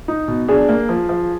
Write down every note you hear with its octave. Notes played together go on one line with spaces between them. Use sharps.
D#4
B2
D4 G#4
A#3
F3
F3